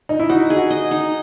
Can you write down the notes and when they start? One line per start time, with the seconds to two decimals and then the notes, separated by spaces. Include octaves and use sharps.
0.09 D#4
0.19 E4
0.29 D#4 F#4
0.50 G#4
0.57 F#4
0.70 D#5
0.91 D#4